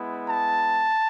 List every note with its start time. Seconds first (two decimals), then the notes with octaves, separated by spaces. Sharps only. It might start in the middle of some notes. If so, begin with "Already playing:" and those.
Already playing: G#3 B3 E4
0.29 A5